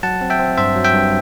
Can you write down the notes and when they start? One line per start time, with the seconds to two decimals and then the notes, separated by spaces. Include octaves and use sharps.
0.03 F#3 F#5 A5
0.21 C4
0.30 E5 G5
0.39 C4
0.58 G2 C5 E5
0.76 F#3
0.84 E5 G5
0.94 G2